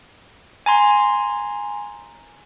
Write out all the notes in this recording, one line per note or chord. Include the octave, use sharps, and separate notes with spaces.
G#5 A#5 C6